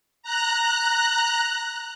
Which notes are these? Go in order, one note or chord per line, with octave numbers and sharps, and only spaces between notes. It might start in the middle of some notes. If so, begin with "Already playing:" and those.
A#5 F#6